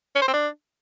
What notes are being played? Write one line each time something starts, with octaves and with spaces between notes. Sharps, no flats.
C#4
C5
C4
D4